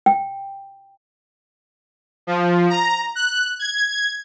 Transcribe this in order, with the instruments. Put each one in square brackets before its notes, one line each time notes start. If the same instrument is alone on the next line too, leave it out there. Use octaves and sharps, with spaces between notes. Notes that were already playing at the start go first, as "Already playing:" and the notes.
[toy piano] G5
[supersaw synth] F3
A#5
F#6
G#6